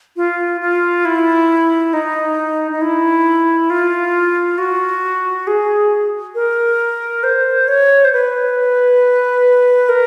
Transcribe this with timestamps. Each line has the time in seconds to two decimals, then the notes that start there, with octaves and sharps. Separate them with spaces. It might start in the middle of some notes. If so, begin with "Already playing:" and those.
0.16 F4
0.61 F4
1.05 E4
1.93 D#4
2.72 D#4
2.81 E4
3.70 F4
4.58 F#4
5.47 G#4
6.35 A#4
7.23 C5
7.68 C#5
8.05 C5
8.13 B4
9.89 A#4